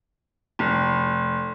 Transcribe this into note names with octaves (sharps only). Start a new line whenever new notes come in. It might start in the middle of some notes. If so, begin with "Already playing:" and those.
F1